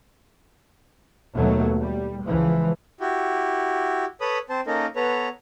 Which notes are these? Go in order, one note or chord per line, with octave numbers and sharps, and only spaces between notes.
D#2 B2 F#3 A3
G3
C#2 E3 F3
E4 F#4 G4
A4 B4 C#5 B5 D#6
C4 C5 A5
A#3 C#4 D#4 A4 A#4
B3 A4 B4 C#5 A#5